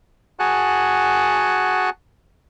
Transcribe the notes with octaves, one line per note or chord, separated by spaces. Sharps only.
F#4 G#4 F#5 G#5 A5 F#6